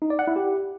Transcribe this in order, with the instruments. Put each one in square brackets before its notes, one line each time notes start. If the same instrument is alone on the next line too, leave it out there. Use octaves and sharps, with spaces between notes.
[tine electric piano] D#4
D5
F#5
E4
G4